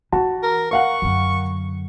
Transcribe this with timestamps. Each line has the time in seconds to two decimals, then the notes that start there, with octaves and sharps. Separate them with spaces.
0.12 E3 F#4 A5
0.42 A#4
0.71 A#4 F5 F#5 C#6
1.02 F#2 D3